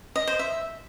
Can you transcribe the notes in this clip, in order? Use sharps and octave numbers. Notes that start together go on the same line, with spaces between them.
D#5
C5
E5